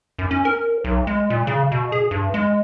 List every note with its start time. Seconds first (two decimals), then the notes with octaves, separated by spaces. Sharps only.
0.19 F#2
0.31 C#4
0.45 A#4
0.84 B1
1.07 G#3
1.30 A#2
1.47 C#3
1.72 B2
1.92 G#4
2.11 G2
2.34 G#3